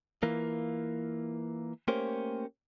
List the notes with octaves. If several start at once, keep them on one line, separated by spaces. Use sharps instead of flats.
E3 A#3 F4
A3 A#3 C#4 G4 A#4 C5